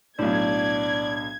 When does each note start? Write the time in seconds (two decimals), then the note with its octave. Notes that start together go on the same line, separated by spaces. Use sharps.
0.19 B1 A2 D4 D5 G#6